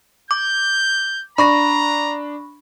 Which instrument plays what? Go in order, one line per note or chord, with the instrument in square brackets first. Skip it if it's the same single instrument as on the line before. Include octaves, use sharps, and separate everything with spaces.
[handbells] D6 [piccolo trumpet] G6
[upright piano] D4 [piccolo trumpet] A#5 [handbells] B5 C#6 A#6